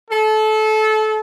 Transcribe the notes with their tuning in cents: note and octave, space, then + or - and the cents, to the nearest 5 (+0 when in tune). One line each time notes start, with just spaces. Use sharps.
A4 -25